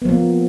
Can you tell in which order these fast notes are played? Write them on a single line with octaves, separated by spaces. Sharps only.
B3 F3 A#3